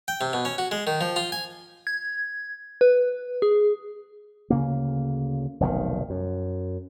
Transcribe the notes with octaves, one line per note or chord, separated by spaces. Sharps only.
G5
C3
B2
C#4
F#4
G#3
D#3
F3
F4
G#5
G#6
B4
G#4
D2 C#3 A#3
F1 B1 A#2 D#3
F#2